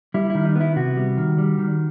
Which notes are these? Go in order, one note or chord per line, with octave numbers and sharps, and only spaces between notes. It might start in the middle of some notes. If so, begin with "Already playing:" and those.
G3 E4
D#3 E4
D#4
B3
E4
C3 F#4
G3
D#3
G3
D#3